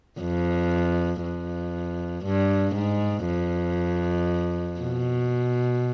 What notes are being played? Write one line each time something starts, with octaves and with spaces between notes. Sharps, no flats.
F2
F2
G2
G#2
F2
B2